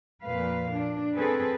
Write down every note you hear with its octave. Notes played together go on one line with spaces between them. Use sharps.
F2 A#2 B4 F5
D4
C4 G#4 A4 B4